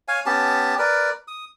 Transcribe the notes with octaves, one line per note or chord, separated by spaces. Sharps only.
C#5 F5 G#5
B3 C#4 G4 A5
A#4 B4 D5
D#6